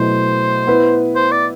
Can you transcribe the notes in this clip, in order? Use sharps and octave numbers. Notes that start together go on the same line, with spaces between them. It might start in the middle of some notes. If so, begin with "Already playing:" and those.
Already playing: B2 F#3 A3 E4 C5
B3 E4 B4
C5
D5